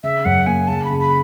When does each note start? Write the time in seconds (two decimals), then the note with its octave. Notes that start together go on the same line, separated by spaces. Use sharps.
0.04 C#3 E5
0.25 F#2 F#5
0.47 A#3 G#5
0.68 C#3 A5
0.85 B5
0.90 C#3
1.00 B5